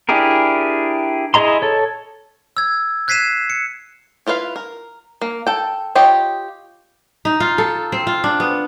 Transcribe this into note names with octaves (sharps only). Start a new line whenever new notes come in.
D4 E4 G4 G#4 A#4
E4 G#4 D#5 A#5 C6
A4 C#5
E6 G#6
F#6 G#6 B6 C7 D#7 E7
C#7
E4 F4 B4 C5 F5
A#4
A#3
A4 G5
F4 G4 C#5 D#5
D#4
F4
A4
C4
F4
D4
B3